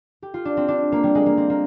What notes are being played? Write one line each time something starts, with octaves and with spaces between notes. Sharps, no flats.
G4
F4
D4
C4
D4
A#3
G3
G#3
A#3
C4
A#3